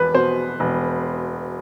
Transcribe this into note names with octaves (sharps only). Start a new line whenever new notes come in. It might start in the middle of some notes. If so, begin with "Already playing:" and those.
Already playing: E1 E2 B4
B2 C5
E1